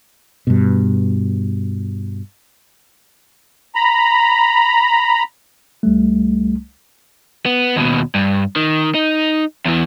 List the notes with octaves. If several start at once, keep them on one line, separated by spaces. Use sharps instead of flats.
G2 B2
A#5 B5
C2 G3 A3
B3
D#2 B2
G2
D#3
D#4
E2 E3